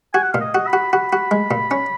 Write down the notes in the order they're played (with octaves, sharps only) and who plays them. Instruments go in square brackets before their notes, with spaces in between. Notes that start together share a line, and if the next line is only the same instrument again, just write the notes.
[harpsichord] F#4 [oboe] G#5
[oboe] F#5
[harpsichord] A#2 [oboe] F5
[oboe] D#5
[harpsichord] F#4
[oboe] B5
[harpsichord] F#4
[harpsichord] F#4 [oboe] B5
[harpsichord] F#4
G#3
A#2
C#4